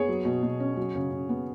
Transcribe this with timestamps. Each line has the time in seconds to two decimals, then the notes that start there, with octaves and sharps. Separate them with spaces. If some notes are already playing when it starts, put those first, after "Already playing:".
Already playing: B3 G#4 C#5
0.08 F#3
0.25 B2
0.43 B2
0.60 C#4
0.77 F#3
0.95 C#3
1.11 C#3
1.29 B3